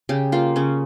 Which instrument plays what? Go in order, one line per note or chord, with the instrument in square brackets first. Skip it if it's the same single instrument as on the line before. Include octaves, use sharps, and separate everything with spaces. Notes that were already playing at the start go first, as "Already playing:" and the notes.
[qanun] C#3 G4
A#3 F4
C#3 C#4